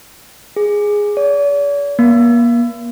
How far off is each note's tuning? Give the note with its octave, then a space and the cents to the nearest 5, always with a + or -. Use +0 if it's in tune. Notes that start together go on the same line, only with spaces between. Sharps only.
G#4 -5
D5 -45
A#3 +35